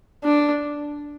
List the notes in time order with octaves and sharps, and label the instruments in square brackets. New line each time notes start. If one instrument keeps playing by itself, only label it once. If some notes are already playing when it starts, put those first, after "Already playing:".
[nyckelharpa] D4